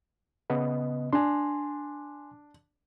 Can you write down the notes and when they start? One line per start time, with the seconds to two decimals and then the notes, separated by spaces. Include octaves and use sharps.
0.50 C#3 B3 D#5
1.13 D4 G#5 C6